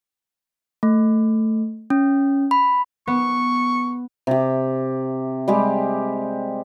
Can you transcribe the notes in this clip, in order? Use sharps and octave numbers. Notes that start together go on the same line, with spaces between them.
A3
C#4
B5
B3 C#6
C3 G4
G3 G#3 G4